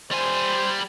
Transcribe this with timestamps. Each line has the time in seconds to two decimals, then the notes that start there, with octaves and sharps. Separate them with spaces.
0.11 G3 C5 G#5